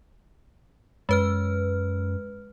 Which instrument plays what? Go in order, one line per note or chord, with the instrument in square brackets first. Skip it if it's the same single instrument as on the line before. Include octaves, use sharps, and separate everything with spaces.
[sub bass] F#2 [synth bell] G#3 B4 F6